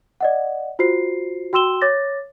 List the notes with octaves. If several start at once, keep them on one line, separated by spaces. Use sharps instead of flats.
D5 D#5 F#5
F4 F#4 C5 C7
F#4 G5 C6 E6 E7 G7
C#5 D6 A6 A#6